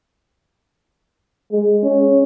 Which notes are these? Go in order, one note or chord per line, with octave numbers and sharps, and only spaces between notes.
G#3
C#4